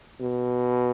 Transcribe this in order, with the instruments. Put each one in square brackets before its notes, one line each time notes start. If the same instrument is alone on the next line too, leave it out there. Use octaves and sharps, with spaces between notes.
[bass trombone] B2